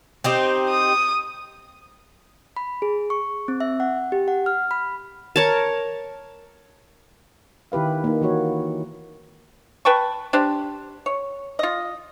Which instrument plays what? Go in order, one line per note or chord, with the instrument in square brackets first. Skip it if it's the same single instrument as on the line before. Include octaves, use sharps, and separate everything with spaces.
[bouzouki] C4 D#4 G4
[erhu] D#6
[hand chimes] B5
G#4
C#6
C4
E5
F#5
G4
F#5
F6
B5
[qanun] A#4 C#5 A5
[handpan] D#3 E4 G4 B4 F5
A#3 D#4
E3 A#3 F#4 C#5
[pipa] B4 G5 A5 C#6
D4 G4 C5
C#5
F4 D#5